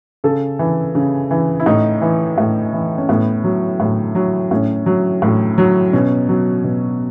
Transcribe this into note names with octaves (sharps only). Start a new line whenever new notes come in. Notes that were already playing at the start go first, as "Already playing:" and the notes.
C#3 A4
E3
C#3
E3
E4
A2 D#4
E3
A2
E3
C#4
A2 B3
F#3
A2
F#3
A2 C#4
F#3
A2
F#3
B2 C#4
F#3
B2